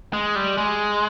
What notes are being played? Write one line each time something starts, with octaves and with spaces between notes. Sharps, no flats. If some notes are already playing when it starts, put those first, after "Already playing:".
G#3
G3
G#3